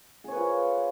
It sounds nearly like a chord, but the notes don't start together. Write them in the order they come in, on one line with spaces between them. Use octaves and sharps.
G#4 C#5 B4 F4